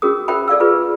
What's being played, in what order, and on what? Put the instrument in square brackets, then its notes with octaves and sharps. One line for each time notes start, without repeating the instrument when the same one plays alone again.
[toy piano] C#4 F#4 G#4 A#4 D#6
A#4 C5 E5 G5 B5
A4 D5 F5 E6
F4 G#4 B4